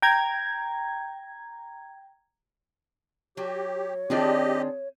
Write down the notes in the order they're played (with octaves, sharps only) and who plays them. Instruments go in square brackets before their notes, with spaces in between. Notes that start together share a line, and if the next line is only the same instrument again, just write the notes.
[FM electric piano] G5 A#5 G#6
[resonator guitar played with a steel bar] F#3 [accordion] G4 [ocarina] C#5
[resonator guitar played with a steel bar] D#3 D4 F4 [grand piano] C4 G#4 [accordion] G4 D#5